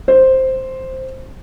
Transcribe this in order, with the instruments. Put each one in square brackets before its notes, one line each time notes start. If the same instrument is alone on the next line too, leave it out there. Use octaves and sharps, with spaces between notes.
[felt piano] C5